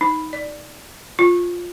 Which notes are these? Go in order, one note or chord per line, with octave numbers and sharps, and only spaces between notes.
D#4
D5
F4